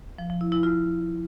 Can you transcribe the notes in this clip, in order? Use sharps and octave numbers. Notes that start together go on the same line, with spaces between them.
F3
F3
E4
E4
F4